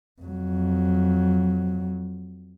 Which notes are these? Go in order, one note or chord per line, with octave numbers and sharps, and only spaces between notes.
F2 F#3